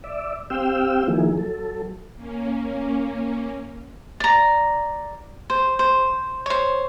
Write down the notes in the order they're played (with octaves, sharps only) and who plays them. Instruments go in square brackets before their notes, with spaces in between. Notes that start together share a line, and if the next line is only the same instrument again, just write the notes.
[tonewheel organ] D5 E5
C4 G4 F5 G5 E6
D#3 F3 F#3 A#3 E4 G#4
F#3 A4
[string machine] A#3 C#4
[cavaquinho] D5 A#5
C5
C5
C5 C#5